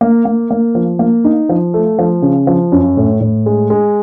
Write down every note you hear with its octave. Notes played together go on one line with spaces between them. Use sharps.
A#3
A#3
A#3
F3
A#3
D#4
F3
A3
F3
C#3
F3
F#2
A2
A2
G#3
G#3